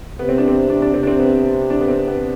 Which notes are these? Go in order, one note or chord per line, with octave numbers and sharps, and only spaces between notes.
C3 B3
C4
D4
C4
D4
D4
C3 C4
D4
C4
B3
D4
B3
C4
B3